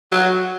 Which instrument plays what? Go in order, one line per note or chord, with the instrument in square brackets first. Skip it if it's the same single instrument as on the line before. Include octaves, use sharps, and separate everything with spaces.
[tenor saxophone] F#3